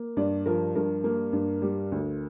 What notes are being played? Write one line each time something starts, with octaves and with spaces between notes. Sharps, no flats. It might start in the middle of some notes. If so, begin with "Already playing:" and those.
Already playing: A#3
G2 D5
F3 A#4
G2 A#4
A#3
G2
G3
D2